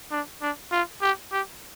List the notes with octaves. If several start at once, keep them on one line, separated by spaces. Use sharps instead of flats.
D4
D4
F4
G4
G4